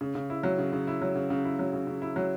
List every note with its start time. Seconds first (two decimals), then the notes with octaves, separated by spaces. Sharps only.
0.01 C#3
0.15 C#3
0.30 E4
0.43 F#3
0.59 C#3
0.73 C#3
0.87 E4
1.02 F#3
1.16 C#3
1.30 C#3
1.44 E4
1.59 F#3
1.73 C#3
1.87 C#3
2.02 E4
2.16 F#3